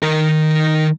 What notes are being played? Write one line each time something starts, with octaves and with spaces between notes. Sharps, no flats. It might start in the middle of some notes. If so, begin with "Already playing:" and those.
D#3 A#4